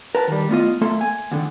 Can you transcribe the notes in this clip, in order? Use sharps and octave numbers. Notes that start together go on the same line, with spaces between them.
A#4 B4 A5
D#3 G3
A3 B3 F4 D#5
A3 A#3 A4 E5 C6
G#5
D2 D3 D#3